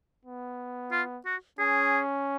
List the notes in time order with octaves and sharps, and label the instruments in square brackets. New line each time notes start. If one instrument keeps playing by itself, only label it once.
[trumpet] B3
[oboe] F4
F#4
[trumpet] C#4 [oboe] G#4